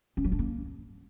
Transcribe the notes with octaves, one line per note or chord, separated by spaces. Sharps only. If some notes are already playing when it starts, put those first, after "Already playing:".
C#4
F#3
D4
A#3